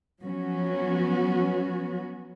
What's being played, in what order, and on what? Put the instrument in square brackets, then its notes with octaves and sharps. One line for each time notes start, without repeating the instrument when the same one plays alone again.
[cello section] F3 F#3 B3 C#4 F#4